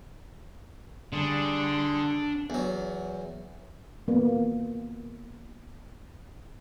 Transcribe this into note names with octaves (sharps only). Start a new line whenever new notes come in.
D3 G3 D4 G#4 C6
E2 F#3
A#3 B3